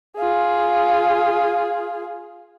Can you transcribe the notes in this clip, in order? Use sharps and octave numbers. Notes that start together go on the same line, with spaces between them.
F4 G#4